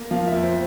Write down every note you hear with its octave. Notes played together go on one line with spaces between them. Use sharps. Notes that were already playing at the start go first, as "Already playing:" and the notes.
Already playing: A#3
F3 F5
F2 E5
C5